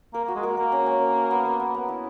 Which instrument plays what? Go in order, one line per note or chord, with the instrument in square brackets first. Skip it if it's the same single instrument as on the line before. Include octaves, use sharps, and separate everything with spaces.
[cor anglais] A#3 [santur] A#4
[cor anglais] A#3
[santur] F#4
[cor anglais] G#3
[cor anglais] A#3 [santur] A#4
[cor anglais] A#3 [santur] A#4
[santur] C#4
C#4
A#4
A#4
B3
A#4
B3
B3
E4